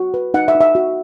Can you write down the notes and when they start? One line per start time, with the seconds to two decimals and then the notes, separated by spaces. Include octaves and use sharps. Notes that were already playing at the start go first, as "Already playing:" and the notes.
Already playing: F#4
0.14 B4
0.34 D#4 F#5
0.48 E5
0.55 D#4
0.61 E5
0.75 F#4